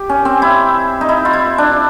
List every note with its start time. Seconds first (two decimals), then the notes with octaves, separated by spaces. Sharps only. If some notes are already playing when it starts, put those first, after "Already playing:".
Already playing: G4
0.09 C#4
0.25 C4
0.42 E4
1.01 D#4
1.09 E4
1.25 F4
1.33 E4
1.58 D4